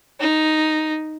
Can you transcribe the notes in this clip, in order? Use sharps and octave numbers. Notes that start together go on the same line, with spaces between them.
D#4